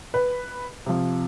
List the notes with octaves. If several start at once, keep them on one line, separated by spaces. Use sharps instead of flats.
B4
C3 F3